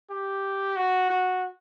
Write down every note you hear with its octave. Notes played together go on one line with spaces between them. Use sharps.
G4
F#4
F#4